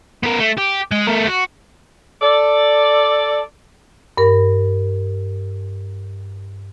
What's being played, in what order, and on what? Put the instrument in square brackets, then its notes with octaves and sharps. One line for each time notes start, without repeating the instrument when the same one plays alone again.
[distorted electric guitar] B3 A#4
A3
G4
G#3
A3 A#4
F#4
[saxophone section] A4 D5
[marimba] G2 A#4